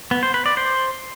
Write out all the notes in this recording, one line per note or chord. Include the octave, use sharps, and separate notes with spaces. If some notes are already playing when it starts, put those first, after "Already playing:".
B3
C5
B4
D5
C5